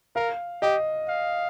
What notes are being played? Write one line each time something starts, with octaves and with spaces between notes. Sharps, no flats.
A#4 F5
G4 D#5
F5